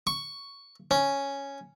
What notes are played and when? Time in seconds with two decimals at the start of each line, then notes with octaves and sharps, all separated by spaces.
0.07 C#6
0.91 C#4